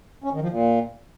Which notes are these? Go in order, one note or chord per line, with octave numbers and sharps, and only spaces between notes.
C#4
D#3
F3
A#2